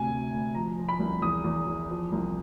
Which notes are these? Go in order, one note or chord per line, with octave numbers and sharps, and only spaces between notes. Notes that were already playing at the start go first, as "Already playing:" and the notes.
Already playing: D2 C3 G#5
D2
D2
F3 A#5
F3
B5
C2
E2 D#6
E2
E2
F3
C2